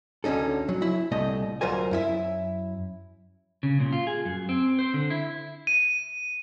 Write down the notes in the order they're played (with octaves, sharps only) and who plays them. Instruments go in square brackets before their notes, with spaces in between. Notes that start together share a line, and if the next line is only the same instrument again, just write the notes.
[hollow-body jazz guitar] D2 D3 C#4 D#4 A4
F#3
E4
C2 A#2 A3 D#5
D2 F#3 F4 A#4 C5 G#5
F#2 E4 E5
[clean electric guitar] C#3
A#2
F4
G#4
F#2
C4
C5
D3
E4
[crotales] D#7